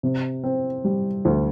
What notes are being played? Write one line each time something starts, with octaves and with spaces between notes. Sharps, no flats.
C3
C4
G3
D2